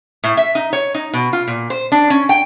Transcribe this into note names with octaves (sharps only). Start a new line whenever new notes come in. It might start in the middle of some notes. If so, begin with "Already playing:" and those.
A2
E5
D#4
C#5
D#4
B2
F4
A#2
C5
D4
C#4
G5